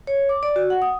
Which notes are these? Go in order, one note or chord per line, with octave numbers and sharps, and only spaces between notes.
C#5
D6
D5
F#4
F#5
D#6